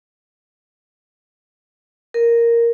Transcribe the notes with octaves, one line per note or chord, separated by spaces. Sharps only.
A#4